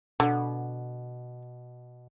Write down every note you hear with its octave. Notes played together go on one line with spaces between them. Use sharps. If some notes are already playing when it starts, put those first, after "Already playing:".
B2 D3